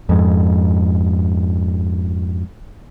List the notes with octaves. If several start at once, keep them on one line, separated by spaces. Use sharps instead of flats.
F2 G#2